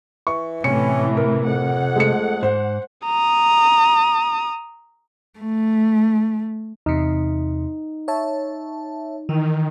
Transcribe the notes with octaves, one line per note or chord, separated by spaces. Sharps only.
E3 C#6
A2 C3 E3 C#4 C#7
A#4
F2 F#5
G#3 A3 C#7
G#2 C5
A#5 D#6
A3
E2 C3 D#4
C#5 E5 A5
D#3 E3